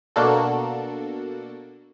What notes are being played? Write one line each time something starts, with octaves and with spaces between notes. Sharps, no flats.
B2 A#3 D4 F#4 A4